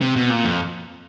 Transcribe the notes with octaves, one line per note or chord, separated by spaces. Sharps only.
C3
B2
A#2
F2